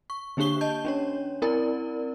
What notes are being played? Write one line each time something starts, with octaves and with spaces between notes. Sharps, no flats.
C#6
D3 A#3 D4 G4 C#6 G7
D#5 A5 G6
C#4 D4 C#5
C4 E4 A#4 D5